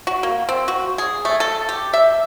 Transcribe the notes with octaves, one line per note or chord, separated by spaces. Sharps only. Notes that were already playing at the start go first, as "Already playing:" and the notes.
F#4
A#3
C4
F#4
G#4
A3
A4
G4
E5